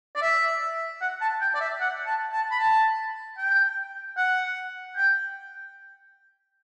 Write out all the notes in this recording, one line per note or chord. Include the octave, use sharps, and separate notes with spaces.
D5
E5
F#5
A5
G5
D5
E5
F#5
A5
A5
B5
A5
G5
F#5
G5